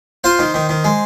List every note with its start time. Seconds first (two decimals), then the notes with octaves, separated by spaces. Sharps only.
0.24 F4 C5
0.39 D#3
0.54 D#3
0.69 D#3
0.84 G#3